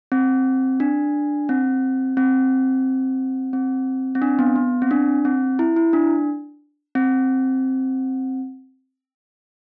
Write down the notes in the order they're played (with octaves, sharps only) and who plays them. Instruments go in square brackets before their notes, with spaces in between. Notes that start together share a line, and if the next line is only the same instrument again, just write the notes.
[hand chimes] C4
D4
C4
C4
C4
C4
D4
B3
B3
C4
D4
C4
E4
E4
D4
C4